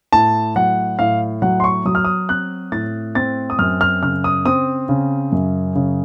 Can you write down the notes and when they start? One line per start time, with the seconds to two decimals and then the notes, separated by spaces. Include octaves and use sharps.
0.13 A2 A5
0.56 F#3 F#5
0.99 A2 F5
1.42 F#3 F#5
1.60 C6
1.64 C#6
1.85 F#3 D#6
1.95 F6
2.05 D#6
2.29 C4 F#6
2.72 A2 A6
3.15 C4 A6
3.50 D#6
3.59 F#2 F6
3.81 F6
4.02 C#3 F6
4.24 D#6
4.46 C4 D#6
4.89 C#3
5.32 F#2
5.75 C#3